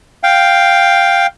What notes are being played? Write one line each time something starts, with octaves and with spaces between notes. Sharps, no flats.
F5 G5